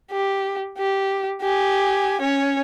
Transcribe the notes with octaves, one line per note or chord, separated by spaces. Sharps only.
G4
G4
G4 G#5
C#4 C#5